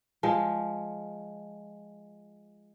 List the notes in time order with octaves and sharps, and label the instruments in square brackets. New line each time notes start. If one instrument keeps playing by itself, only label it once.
[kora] F3 G#3